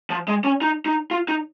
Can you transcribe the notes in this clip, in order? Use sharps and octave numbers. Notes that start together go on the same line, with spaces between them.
F3
G#3
C#4
D#4
D#4
F4
D#4